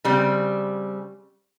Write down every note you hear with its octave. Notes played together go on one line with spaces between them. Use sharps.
C#3 G3 C4